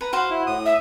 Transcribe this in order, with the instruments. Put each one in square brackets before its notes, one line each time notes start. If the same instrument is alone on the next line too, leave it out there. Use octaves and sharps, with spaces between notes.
[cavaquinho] B4 A#5
[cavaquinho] F#4 C5 F#5 [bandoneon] F5
[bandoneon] E4
A2 D#6
[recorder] E5